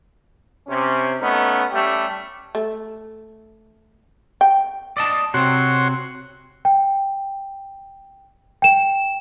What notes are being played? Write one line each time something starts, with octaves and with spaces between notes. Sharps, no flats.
C3 C#4
A3 B3 C#4 D#4
G3 A3 C#4 G4
A3
G5
D5 D#5 A5
C3 C4 F#4 C#5 C6
G5
G5 E7